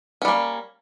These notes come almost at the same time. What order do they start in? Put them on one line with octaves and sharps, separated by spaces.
C#4 G3 A#3